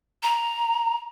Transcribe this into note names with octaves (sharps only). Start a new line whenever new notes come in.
A#5